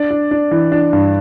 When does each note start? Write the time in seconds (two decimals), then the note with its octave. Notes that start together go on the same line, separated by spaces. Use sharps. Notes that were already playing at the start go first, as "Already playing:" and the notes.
Already playing: D4 D5
0.11 D4
0.31 D4
0.51 E3
0.72 D4
0.93 G2